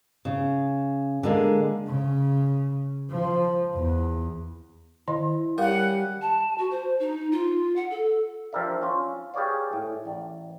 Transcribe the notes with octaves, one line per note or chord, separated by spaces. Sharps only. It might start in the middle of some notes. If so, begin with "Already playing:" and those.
C#3
D3 G#3 A#3
C#3
F3
E2
D#3 E4 D#5
G3 C#4 G4 A#4 F5 F#5
A5
F#4
C5
D#4
F4
F#5
A4
F3 D4 G4 A#4 D5 E5
C#4 F4
G4 G#4 B4 C#5 D5 F5
A2
A1 D5